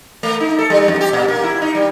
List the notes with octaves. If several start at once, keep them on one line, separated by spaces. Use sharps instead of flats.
A3
D#4
A4
G3
F2
G4
A#2
A#3
E4
D#4
G3